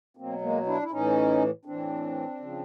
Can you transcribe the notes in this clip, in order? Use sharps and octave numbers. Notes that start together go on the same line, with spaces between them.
B2 F#3 A#3 C4
G#3 A#3
D4 E4
E4
A2 E3 C#4 D#4
A2 E3 C4 D4
C#3 F3